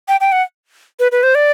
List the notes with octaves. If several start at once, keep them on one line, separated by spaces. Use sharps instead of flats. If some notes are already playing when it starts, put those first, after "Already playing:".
G5
G5
F#5
B4
B4
C5
D5